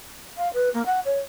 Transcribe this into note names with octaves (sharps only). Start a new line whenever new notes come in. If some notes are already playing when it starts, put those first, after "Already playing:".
F5
B4
A#3
F#5
C#5